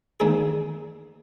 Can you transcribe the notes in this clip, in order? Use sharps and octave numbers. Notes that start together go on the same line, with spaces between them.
D#3 A#3 D#4 G#4